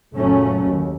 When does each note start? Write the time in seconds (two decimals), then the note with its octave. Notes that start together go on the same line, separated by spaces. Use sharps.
0.13 F#1 A#2 F#3 A3 C#4
0.66 D#2